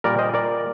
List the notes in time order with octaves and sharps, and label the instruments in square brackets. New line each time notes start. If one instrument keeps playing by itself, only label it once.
[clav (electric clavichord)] A#2 G3 A#4 D5
C5 D#5
A#4 D5